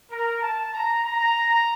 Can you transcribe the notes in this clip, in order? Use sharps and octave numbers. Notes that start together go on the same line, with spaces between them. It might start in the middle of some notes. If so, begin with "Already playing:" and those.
A#4
A5
A#5
A#5